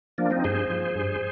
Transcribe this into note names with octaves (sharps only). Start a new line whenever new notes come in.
F3 A#3 D4
C4 D#4
G2 G#4 C5
F3
G2